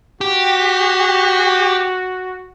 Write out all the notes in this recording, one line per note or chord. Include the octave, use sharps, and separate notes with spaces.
F#4 G4